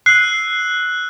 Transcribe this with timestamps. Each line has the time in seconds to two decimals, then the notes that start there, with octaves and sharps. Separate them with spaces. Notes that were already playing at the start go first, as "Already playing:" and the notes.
0.06 E6 F#6 C7